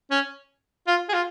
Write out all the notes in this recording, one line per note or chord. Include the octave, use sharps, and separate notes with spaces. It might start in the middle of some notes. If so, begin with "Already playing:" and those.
C#4
F4
G#4
F4